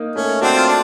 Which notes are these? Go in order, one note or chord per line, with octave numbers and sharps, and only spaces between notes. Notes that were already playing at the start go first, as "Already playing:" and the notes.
Already playing: A#3 D#4
A3 C#4
C4 D4 F#4
F4
D4